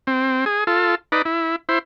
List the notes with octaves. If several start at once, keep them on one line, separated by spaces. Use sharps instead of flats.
C4
G#4
F4 A4
D#4 B4 D5
E4
E4 C5